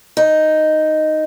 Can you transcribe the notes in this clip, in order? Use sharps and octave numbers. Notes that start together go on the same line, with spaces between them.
D#4